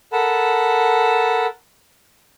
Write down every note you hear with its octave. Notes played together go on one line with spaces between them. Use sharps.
A4 A#4 F#5 A5 B5